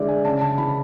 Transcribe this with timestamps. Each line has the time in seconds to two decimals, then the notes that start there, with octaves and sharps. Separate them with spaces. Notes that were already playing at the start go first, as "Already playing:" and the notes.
Already playing: D3 E3 G#3 D5 E5
0.08 G#5
0.24 C#3 A5
0.41 A5
0.58 E3 B5